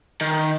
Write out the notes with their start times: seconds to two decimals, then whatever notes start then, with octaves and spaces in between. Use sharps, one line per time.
0.21 D#3